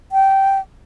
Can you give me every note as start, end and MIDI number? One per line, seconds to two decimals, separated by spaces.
0.12 0.59 79